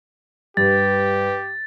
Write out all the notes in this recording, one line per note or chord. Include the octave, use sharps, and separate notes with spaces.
G2 G4 B4 A6